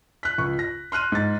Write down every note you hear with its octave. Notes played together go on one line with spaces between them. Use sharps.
F#6 B6
C#2 C#6
A#6
C6 F6 F#6 D#7
G#2 A6